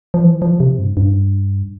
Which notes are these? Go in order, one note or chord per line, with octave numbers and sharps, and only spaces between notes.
F3
E3
F3
C3
G2
G2